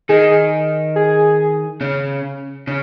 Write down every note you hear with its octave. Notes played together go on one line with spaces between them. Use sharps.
D#3 D#4 G#4
G#4
C#3 C#4
C#3 C#4